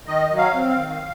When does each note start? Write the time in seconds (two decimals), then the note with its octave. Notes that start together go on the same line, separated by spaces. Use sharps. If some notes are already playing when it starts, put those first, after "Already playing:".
0.07 D#3 D#5
0.30 F#3
0.37 F5
0.54 C4
0.69 F5
0.76 D#3